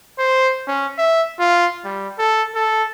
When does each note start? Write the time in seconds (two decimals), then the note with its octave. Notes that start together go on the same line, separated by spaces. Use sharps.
0.19 C5
0.68 C#4
0.98 E5
1.39 F4
1.85 G3
2.19 A4
2.55 A4